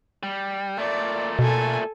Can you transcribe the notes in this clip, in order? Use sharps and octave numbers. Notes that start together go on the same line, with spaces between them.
G3
A#2 A3 D5
B2 A4 G#5